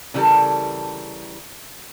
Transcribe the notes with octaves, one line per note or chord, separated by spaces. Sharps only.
C#3 E3 G3 D4 A4 A#4